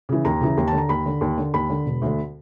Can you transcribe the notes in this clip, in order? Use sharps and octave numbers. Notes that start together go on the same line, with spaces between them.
C#3 E3
D#2 A#5
C#3 E3
D#2
A5
D3
A#5
D#2 B5
D3
D#2
D3
D#2 B5
D3
E1
D2 D3